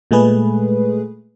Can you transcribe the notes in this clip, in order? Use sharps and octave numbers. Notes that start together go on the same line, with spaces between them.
A#2 G#3 A3 G#4 B4